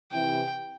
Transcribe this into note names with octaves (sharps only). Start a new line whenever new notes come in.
C3 E3 G5